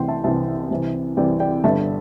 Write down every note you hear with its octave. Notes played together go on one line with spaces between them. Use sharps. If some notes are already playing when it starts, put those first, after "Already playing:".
Already playing: C2 C3 E3 G5 C6
E5 A5
C2 C3 E3 E5 A5
C2 C3 E3
C2 C3 E3 D5 G5
D5 G5
G1 G2 D3 E5 A5